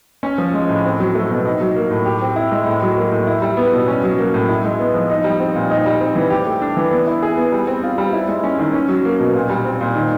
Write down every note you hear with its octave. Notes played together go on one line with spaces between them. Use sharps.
C#4
F3
G#3
A2
C4
F#3
A3
B2
D#4
F#3
A#3
A2
G4
C4
E4
G#3
A2
F#3
A#3
A2
E4
G3
B3
B2
C#4
F#3
A#3
A2
E4
G#3
B3
F3
D#4
G3
C4
A#2
D#4
G3
C4
E3
G4
A3
D4
E3
B3
E4
G#4
B3
G3
C4
F4
G3
E4
G#3
C#4
D#3
C#4
F#3
A#3
B2
A#2
G3
C4
A#2
D#3